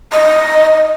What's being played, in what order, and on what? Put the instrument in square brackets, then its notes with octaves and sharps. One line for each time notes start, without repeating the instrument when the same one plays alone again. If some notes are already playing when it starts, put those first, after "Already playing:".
[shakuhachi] D#5